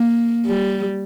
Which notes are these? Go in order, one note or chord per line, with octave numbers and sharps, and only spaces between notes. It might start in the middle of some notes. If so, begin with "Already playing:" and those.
Already playing: A#3
G3